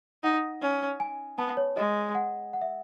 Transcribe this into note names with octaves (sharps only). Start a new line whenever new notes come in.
D#4 F#5
C#4
G#5
B3 A5
C#5
G#3 D#5
F#5
F#5
E5